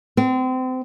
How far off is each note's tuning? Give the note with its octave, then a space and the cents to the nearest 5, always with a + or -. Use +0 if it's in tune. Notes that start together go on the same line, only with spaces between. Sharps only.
C4 -30